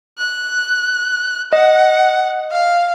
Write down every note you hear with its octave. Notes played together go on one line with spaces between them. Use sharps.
F#6
D#5 F#5
F5